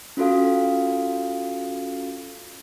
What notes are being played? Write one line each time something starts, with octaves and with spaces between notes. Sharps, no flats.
C#4 F4 F#4 A4 F5